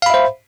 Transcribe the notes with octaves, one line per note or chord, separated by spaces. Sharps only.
C5 E5 F5 B5